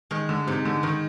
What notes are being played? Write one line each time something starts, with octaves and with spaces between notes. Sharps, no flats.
D#3 G#3
D3
G#2 C3
D3
G#2 D#3